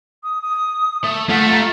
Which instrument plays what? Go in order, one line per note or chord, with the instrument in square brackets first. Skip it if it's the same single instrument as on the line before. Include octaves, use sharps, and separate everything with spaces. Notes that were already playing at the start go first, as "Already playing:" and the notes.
[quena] D#6
D#6
[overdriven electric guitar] A3
[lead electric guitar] A3 [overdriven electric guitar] F4 E5 [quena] F#5
[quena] A#5